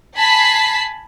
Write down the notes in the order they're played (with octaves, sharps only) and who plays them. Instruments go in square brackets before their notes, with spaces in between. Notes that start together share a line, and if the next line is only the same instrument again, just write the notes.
[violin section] G#5 A5 B5 B6 C7